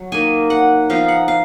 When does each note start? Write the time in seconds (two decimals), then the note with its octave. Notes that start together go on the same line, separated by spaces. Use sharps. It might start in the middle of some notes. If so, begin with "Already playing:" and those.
Already playing: F#3
0.12 D#3 A#3 D#4 G#5
0.50 F#5
0.90 F3 B3 D#4 F5
1.08 F#5
1.28 F5